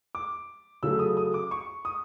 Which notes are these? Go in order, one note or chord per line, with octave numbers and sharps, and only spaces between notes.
D6
C#3 F#3 A3 E6
E6
D#6
D#6
D6
C#6
D#6